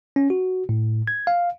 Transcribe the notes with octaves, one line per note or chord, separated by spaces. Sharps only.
C#4
F#4
A2
G#6
F5